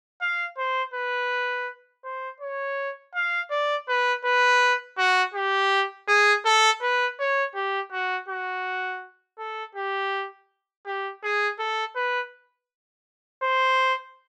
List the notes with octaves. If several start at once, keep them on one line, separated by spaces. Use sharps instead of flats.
F5
C5
B4
C5
C#5
F5
D5
B4
B4
F#4
G4
G#4
A4
B4
C#5
G4
F#4
F#4
A4
G4
G4
G#4
A4
B4
C5